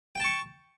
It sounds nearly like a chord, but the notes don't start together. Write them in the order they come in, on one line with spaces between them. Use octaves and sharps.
G5 A5 C#6